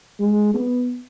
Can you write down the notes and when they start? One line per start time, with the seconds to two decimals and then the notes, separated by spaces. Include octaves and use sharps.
0.20 G#3
0.54 B3